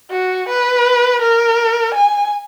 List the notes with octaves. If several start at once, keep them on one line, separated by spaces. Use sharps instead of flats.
F#4
B4
A#4
G#5